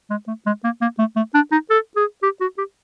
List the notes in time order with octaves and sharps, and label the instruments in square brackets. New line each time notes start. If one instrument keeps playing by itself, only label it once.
[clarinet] G#3
A3
G#3
A#3
A#3
A3
A3
D4
D#4
A4
G#4
G4
F#4
G4